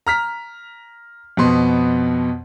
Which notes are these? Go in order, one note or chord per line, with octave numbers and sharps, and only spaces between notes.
A#5 F6 B6
F2 B2 B3 C6